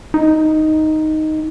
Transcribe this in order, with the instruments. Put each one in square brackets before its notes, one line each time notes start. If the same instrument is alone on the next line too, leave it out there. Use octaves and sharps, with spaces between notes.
[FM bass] D#4